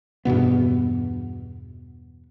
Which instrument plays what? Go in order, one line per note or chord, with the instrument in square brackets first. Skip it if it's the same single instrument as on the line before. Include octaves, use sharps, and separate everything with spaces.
[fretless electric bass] E2 G2 B2 B3